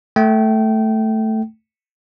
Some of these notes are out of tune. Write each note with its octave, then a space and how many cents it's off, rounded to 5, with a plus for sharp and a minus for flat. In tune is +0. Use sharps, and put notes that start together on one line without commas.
A3 +0 G5 -25